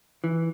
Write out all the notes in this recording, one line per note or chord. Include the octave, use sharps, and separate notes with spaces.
E3